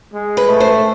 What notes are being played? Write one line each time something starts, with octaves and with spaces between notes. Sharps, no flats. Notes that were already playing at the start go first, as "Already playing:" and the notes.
G#3
B4
A3
C5